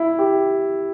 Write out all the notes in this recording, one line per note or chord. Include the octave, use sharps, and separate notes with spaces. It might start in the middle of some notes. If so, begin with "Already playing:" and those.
Already playing: E4
G4